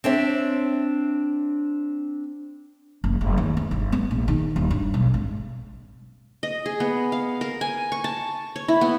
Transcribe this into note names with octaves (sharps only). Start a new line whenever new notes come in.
C4 D4 C#5 E5
F#1
F#1
D#2
B3
G1
B3
A#1
D#3
D#1
G2
B1
G#1
D#5
G#4
B3
F5
A#4
G#5
C#6
A5
C#5
E4
B3